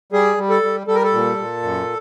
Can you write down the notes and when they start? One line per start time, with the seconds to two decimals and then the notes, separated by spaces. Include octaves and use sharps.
0.12 G3 G#4
0.37 G3
0.50 A4
0.63 G3
0.87 G3 A4
0.95 A#4
1.04 A4
1.12 A#2
1.38 A#2
1.62 F#2